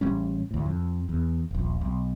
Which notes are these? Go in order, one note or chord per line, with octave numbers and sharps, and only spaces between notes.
A1 G3 C#4
D2 A2
F2
E2
D#1 A#1
B1